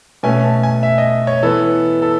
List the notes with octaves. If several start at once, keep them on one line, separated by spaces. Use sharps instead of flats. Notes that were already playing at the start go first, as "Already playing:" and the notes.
B2 A3 C#4 G#5
A5
G#5
E5
D#5
C#5
E3 B3 A4
A4